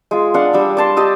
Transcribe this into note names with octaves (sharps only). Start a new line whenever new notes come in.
G#3 F4
D4 F5 F#5
G3 D4 E6
D5 A5 C6
G4 D#5 A5 E6